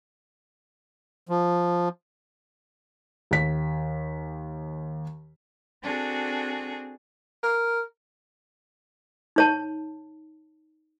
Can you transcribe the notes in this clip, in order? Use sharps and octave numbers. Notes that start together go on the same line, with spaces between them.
F3
D#2 B6
C4 D4 F#4 G#4 A4
A#4
D#4 C#5 A5